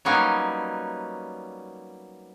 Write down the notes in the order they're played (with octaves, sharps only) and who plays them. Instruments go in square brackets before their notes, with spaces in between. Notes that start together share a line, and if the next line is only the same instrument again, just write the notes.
[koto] F#3 G3 A#3 B3 C#4 D#4